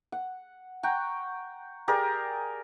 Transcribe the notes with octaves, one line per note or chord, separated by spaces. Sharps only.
F#5
F#5 G5 A#5 C#6
G4 G#4 A#4 D5